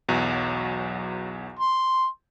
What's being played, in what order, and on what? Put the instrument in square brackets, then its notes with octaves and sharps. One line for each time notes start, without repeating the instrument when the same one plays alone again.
[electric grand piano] B1 E2 F#3
[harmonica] C6